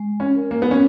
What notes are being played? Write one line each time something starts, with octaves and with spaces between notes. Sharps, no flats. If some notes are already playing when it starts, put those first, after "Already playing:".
Already playing: G#3
C#4
A#4
A#3
B3
C#4